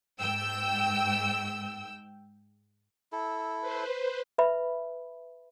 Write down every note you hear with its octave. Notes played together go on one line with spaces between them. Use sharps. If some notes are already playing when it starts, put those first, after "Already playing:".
G#2 G5 E6
E4 A4
B4 C5
B4 E5 B5